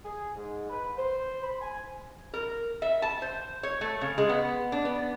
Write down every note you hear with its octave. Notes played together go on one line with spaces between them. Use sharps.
G#4
G#2
B4
C5
B5
G#5
A#4
E5
A5
C5
C#5
A3
C#3
G#3
B3
D4
B3